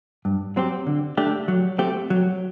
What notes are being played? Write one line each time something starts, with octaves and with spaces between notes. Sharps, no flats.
G2
F#3 C4 G4
D3
A3 D4 G4
F#3
A3 C4 G4
F#3